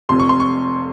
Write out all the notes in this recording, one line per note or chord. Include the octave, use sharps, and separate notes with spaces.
F1 F2 C3 C6
C#6
C6
C#6